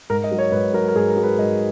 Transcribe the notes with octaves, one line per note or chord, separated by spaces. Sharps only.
G#2 A#4
D#5
F#3
C#5
G#2 B4
F#3 A#4
A#4
G#2 G#4
A#4
F#3
B4
G#2 D#5